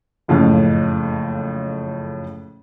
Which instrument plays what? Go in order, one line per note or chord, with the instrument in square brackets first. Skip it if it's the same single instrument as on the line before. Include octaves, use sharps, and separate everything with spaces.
[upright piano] F#1 F2 A2 C#3 F5